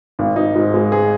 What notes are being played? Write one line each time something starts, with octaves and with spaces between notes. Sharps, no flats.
G#1
D#4
G#2
G#3
G#4